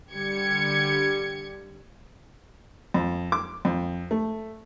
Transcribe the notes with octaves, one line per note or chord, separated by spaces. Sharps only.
D3 G3 G4 G#6 C#7
F2
D6
F2
A3